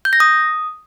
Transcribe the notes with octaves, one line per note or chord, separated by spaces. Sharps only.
G6
A#6
D#6